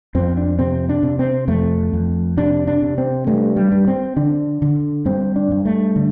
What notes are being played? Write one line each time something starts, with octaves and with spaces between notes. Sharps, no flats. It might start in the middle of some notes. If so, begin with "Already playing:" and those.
F2 C4
D4
C3 C4
D4
C3
C4
F2 A3
F2
C3 D4
D4
C3
C4
G2 A3
G3
G2
C4
D3 D4
D3
G2 C4
D4
G2
A3
D3